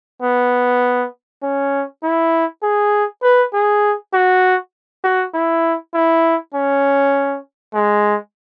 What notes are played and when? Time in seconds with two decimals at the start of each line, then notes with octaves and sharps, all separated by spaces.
0.22 B3
1.43 C#4
2.03 E4
2.63 G#4
3.23 B4
3.53 G#4
4.14 F#4
5.04 F#4
5.34 E4
5.94 E4
6.54 C#4
7.74 G#3